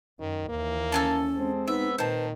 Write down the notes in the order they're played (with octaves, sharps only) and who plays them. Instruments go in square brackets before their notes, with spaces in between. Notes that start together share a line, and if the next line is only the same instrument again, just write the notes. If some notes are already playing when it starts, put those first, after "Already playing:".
[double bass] F#2 [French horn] D#3
[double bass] D#2 E3 [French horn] A#3
[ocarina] C#4 [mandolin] A4 G#5 A5
[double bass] G#3 C4
[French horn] B3 [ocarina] D#4 [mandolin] E5
[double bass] A#2 [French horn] D#3 [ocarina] B4 [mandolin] C5 A5